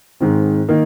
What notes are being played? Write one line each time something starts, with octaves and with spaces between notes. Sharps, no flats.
G#2 D#3 C4
D#3 A#3 D#4